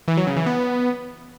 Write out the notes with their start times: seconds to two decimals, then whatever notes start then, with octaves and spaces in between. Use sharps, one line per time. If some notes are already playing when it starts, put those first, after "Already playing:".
0.08 E3
0.17 F#3
0.27 C#3
0.37 E3
0.46 B3